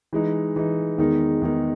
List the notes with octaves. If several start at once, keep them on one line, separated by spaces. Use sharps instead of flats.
E3 G#3 D#4
E3 G#3 D#4
E2 D#3 G#3 D#4
E2 D#3 G#3 D#4